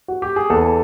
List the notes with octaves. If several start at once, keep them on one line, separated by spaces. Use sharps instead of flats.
F#4
G4
G#4
E2 A4